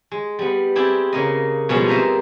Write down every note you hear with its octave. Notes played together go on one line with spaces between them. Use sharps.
G#3
G3 B3
C4 E4 G4 G#4 D5
C#3 A#3 D#5
B2 F3 G3 G#3 C#4
A#3 C4 C5 D#5 E5 A#5